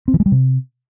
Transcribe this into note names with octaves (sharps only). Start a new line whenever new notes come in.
C4
E3
G#3
G3
C3